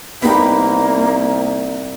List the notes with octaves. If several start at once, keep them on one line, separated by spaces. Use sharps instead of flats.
C2 A#3 B3 D#4 G4 B5